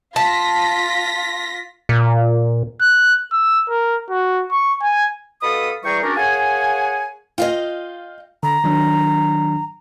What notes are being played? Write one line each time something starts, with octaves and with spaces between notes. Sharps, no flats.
F4 A5 A#6 B6
A#2
F#6
E6
A#4
F#4
C#6
G#5
B2 A4 F5 B5 D#6
E3 G3 G#4 G5 A#5 C#6
C#4 D4 F#4 G4 A#4
A#3 G#4 C#5 F#5 G#5
F4 D#5 F5 G5
D3 A#5
D#3 F#3 D4